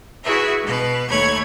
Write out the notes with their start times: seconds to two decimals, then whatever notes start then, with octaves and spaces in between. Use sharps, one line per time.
0.23 E4 F#4 G#4 B4 E5
0.64 B2 B4
1.08 D#2 A3 C#5 B5 G#6